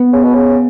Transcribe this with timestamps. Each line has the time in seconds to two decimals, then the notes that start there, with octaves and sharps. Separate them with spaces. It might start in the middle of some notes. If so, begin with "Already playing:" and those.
Already playing: B3
0.13 C#3
0.23 B2
0.34 C#3